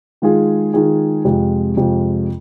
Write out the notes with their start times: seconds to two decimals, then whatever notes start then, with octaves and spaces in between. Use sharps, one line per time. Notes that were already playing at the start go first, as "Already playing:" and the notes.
0.22 D#3 G#3 F4 G#4
0.74 D#3 G#3 F4 G#4
1.25 F2 C3 G#3 F4
1.77 F2 C3 G#3 F4